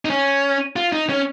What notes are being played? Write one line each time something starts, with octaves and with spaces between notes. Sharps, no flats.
D#4
C#4
F4
D#4
C#4